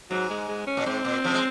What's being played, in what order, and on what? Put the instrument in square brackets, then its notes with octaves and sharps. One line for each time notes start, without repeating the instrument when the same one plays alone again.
[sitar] G#2 [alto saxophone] F#3
[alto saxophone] G#3
G#3
C#4
[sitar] A#2
[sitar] G#2 [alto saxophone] C4
[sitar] A#2
C#3 F3
G#3